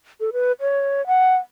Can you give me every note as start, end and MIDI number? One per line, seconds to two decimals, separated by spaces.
0.20 0.30 69
0.33 0.52 71
0.61 1.05 73
1.07 1.36 78